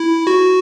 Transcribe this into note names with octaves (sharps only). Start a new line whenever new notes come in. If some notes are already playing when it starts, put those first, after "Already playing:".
Already playing: E4
F#4